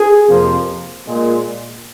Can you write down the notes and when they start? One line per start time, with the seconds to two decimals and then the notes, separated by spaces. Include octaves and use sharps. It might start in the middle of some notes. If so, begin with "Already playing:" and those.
Already playing: G#4
0.27 F2 C3 F3 A#3
1.06 A#2 G#3